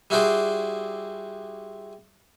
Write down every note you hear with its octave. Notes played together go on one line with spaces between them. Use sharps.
G3 E4 F#4 G#4 C5 D5